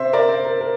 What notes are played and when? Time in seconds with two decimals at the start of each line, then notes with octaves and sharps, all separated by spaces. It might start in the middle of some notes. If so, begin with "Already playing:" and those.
Already playing: C3 C4 C5 E5
0.13 A#4 D5
0.29 C5
0.45 A#4
0.61 A#4